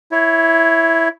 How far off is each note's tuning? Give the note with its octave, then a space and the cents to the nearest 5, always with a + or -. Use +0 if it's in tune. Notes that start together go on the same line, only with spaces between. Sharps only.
E4 +0 C#5 +0